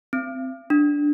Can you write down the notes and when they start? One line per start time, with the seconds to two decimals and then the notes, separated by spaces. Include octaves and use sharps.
0.13 C4
0.70 D4